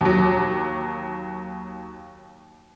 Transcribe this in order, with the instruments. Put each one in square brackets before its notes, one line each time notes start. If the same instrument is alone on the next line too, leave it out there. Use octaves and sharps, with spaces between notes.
[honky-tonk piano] D#2 F#3